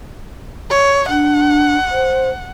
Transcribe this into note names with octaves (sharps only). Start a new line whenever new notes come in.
C#5
D4 F#5
C5